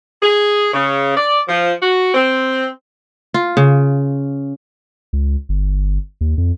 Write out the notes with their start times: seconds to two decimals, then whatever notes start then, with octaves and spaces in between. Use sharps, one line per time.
0.22 G#4
0.73 C#3
1.17 D5
1.48 F3
1.81 F#4
2.14 C4
3.34 F4
3.57 C#3
5.13 C#2
5.49 G1
6.21 D#2
6.38 F2